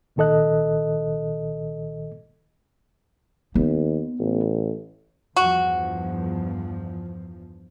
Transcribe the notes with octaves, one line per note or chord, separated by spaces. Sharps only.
C2 A#2 D#3 A4 D#5 F#6
D#2 B3
A1
E2 G2 F3 F#4